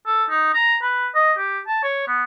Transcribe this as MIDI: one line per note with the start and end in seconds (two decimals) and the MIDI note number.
0.07 0.24 69
0.30 0.51 63
0.54 0.77 82
0.83 1.09 71
1.15 1.33 75
1.38 1.60 67
1.68 1.80 81
1.83 2.05 73
2.08 2.24 59